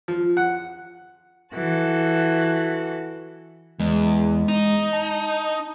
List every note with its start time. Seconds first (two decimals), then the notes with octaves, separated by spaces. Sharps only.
0.08 F3
0.37 F#5
1.53 E3 F#4 A4
3.80 E2 G#3
4.48 D#4
4.93 A5